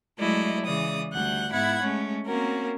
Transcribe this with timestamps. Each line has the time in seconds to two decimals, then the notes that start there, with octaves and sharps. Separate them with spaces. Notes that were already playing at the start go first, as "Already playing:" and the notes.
0.19 F#3 G#3 A3 E4 D5 D#5
0.66 C#3 E3 G#3 D5 D#6
1.13 D2 G3 F#5 F#6 G6
1.52 G#2 B3 E4 F#5 B5 G#6
1.82 G#3 A3 C#4
2.26 A#3 C4 C#4 F#4 A#4